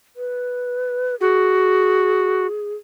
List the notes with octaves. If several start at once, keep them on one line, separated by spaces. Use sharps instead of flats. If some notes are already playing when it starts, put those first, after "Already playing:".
B4
F#4 G#4